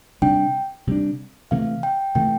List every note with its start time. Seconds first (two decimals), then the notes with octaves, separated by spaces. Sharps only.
0.22 C3 G3 D4 G5
0.87 C3 G3 D4
1.51 C3 E3 A3 F5
1.83 G5
2.15 C3 E3 A3 G5